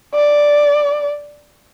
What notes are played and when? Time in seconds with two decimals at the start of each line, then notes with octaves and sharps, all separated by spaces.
0.15 D5